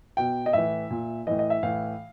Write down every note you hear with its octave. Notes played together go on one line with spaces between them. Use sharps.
B2 G5
D#5
A2 E3 E5
A#2
A2 E3 D#5
D#5
E5
A2 E3 F5